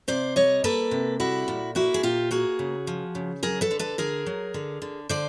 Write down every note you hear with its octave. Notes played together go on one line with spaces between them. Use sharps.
C3 C5 D5
G3 C#5 D#5
A#3 A4 B4
C3
G3 E4 F#4
A#2
A#3 E4 F#4
G#4
A#2 F4 G4
A#3 F#4 G#4
C#3
F3
C#3
F#3 G#4 A#4
A4 B4
D3
A4 B4
D3 G#4 A#4
F#3
D3
D3
D3 C5 D5